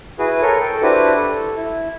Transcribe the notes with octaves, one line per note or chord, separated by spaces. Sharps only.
E4 F#4 G#4 B4
A4 A#4 C#5
A4 G5
D4 E4 F#4 G4 B4 C5
A4
E4